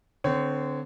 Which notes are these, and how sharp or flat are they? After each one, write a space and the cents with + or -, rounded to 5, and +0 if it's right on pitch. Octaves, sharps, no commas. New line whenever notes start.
D3 +0 C4 -25 C#5 +0